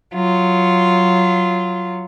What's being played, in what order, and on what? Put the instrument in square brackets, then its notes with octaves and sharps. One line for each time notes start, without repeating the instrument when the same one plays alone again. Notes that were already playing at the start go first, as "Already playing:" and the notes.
[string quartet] F#3 F4